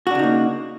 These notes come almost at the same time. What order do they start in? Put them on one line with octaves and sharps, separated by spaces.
F#4 D4 C#3 D#4 A#3